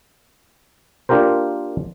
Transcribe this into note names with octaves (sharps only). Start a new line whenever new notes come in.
A#3 D4 F4 G4 A#4 C5